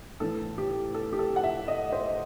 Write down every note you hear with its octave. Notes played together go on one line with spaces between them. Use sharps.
A2 E3 A4
G4
A4
G4
A4
F#5
E5
D#5
C5